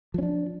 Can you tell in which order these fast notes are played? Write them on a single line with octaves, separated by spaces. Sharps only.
F3 C#4 D4